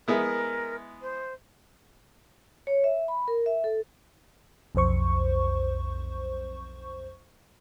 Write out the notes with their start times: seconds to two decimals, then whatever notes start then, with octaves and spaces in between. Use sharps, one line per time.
0.08 G#3 B3 E4 A#4
1.02 C5
2.67 C#5
2.84 E5
3.08 B5
3.28 A#4
3.46 E5
3.64 A4
4.75 B1 F2 C5 C#6